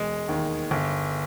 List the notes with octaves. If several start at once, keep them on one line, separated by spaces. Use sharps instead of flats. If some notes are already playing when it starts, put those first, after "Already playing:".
Already playing: E1 G#3
D#2 D#3
G1